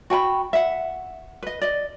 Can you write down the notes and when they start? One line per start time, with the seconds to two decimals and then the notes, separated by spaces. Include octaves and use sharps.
0.10 F#4 G5 G#5 B5
0.53 E5 F#5
1.43 B4 D#5
1.62 D5 D#5